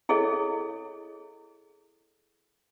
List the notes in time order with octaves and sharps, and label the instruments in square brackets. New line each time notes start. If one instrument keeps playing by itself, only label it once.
[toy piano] E4 G#4 A4 C#5 D#5